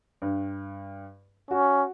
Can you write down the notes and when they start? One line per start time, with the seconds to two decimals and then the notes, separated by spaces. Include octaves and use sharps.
0.22 G2
1.51 C#4 F#4